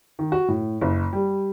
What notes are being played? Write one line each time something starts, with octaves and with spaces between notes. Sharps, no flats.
D#3
F#4
A2
F#1
G3